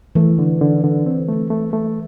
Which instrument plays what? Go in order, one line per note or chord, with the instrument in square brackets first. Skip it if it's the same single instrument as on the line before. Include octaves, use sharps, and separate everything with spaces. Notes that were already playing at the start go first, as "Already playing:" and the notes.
[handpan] E3 [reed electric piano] A3
[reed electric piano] D3
D3
D3
C4
A3
A3
A3